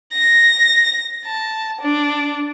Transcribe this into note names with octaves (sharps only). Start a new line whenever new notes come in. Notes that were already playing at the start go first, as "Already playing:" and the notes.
A#6
A5
D4